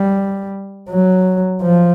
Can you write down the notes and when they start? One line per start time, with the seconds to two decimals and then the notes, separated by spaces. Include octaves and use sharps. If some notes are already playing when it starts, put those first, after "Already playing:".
Already playing: G3
0.90 F#3
1.62 F3